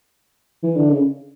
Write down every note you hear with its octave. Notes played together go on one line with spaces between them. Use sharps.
E3
D3
C#3